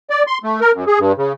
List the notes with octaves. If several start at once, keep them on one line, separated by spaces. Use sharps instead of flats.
D5
C6
A3
A#4
F#2
G#4
G2
C#3